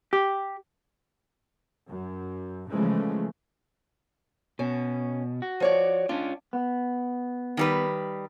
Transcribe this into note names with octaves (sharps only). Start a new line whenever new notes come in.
G4
F#2
C#3 E3 F3 G#3 A3
B2 C#4
F#4
F3 C#5 D5
C#4 D4 F4
B3
D#3 G3 B4